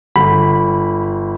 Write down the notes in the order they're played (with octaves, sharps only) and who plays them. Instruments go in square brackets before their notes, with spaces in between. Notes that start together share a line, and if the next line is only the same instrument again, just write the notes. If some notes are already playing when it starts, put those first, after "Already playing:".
[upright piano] G1 [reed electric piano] B5